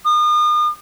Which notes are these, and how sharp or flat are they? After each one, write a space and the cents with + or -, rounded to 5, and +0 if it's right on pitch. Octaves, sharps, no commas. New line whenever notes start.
D#6 -40